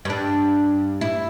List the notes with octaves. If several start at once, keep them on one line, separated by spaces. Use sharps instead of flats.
G2 D4
E4